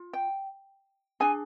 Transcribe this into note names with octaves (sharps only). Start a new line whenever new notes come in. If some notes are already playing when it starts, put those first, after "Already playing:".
Already playing: F4
G5
D4 G#4 G#5